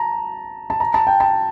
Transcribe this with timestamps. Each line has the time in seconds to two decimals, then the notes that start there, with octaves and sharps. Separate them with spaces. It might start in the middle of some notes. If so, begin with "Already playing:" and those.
Already playing: A5 A#5
0.70 A5
0.80 A#5
0.94 A5
1.07 G5
1.20 A5